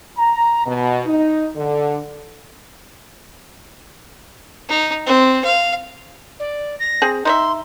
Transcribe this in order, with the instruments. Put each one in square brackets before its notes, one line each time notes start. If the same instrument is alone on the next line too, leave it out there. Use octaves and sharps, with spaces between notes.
[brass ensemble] A#5
B2
D#4
D3
[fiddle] D#4
C4
F5
[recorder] D5
A#6
[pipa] C4 G#4
[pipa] D#4 D#5 E5 [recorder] C6